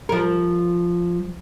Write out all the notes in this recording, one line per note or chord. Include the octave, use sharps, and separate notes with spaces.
F3 A#4